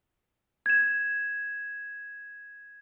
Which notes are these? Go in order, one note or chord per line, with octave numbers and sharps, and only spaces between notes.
G#6 E7